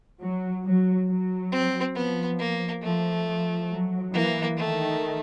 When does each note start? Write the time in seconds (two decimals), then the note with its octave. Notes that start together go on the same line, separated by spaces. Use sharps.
0.21 F#3
0.65 F#3
1.09 F#3
1.52 C4
1.95 F3 B3
2.39 A#3
2.82 F3 A3
3.26 F3
3.69 F#3
4.13 E3 A#3
4.57 D#3 A3